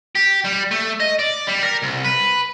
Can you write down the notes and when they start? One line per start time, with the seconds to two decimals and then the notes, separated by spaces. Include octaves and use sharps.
0.15 G4
0.44 G3
0.71 A3
1.00 D#5
1.19 D5
1.48 G3
1.63 A#4
1.83 C2
2.04 B4